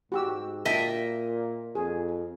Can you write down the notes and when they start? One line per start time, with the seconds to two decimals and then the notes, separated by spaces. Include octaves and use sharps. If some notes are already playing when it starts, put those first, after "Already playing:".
0.12 G#2 F#4 G4 E6
0.65 A#2 D#5 E5 G5 A5
1.75 F2 G#4